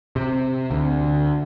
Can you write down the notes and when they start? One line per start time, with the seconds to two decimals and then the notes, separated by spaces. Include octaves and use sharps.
0.16 C3
0.71 D2